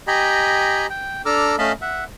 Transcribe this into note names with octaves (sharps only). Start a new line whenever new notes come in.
G4 D#5 G5 G#5 A#5 B5
G5
D4 A4 A#5 D6 E6 F6
A3 C#4 D#5 F5 A5 B5
E5 F#5